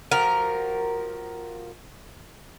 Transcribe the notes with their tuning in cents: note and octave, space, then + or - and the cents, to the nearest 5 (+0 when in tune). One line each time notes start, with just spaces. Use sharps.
F3 +10 F#4 +30 A#4 +0